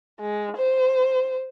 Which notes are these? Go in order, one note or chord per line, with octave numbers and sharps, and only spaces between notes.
G#3
C5